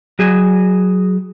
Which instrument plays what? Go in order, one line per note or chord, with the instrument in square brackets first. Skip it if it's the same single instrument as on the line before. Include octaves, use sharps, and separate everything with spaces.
[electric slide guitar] F#3 F#4 G#4